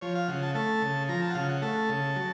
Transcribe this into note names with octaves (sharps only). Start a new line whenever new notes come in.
F3 C#5
F5
C#3 F#5
A5
A3 A5
C#3
F3 A#5
A5
F#5
C#3 F5
F#5
A3 A5
C#3
F#3